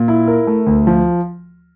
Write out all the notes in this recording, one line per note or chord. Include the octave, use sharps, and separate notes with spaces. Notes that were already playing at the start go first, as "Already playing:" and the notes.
Already playing: A#2
E4
A#4
A3
D2
F3